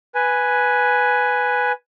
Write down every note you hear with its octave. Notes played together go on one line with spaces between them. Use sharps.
B4 G#5